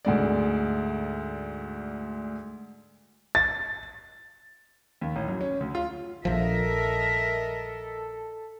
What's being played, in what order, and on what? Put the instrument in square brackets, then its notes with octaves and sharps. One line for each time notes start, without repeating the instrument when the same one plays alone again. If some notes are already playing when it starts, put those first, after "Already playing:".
[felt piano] D2 G#2 D5
[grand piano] A6
D#2
A1
F#2
C#4
D2
F4
[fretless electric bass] A#1 F3 [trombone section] A4 [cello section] A#4 D#5 E5